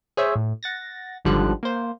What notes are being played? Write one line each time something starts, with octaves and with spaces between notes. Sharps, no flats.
G#4 C5 C#5 E5
A2
F#5 A6 A#6
G#1 G#2 D3 F3 G3 F#6
A#3 C5